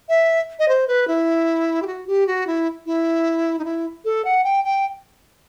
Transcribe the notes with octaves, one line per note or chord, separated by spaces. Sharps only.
E5
D#5
C5
B4
E4
G4
F#4
G4
F#4
E4
E4
D#4
E4
A4
F#5
G5
G5